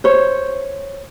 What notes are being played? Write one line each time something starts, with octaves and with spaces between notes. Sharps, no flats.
C5 C#5